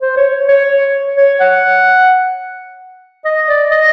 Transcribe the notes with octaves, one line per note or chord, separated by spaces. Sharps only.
C5
C#5
C#5
C#5
C#5
F#5
D#5
D5
D#5